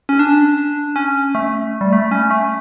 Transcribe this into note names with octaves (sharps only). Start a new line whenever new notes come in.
C#4
D4
C#4
A3
G3
A3
C#4
A3